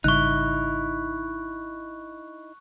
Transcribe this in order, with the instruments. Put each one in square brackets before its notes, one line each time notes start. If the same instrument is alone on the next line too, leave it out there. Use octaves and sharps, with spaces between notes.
[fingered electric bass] G#1 C#3 G3 [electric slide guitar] D#4 E4 [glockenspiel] C#6 F#6